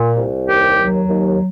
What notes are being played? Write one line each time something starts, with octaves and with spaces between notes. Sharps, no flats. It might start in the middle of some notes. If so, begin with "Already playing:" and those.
Already playing: A#2
C2
D#2 G4
F#3
D#2